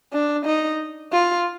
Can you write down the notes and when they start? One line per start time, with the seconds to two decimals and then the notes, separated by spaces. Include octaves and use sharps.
0.13 D4
0.46 D#4
1.12 F4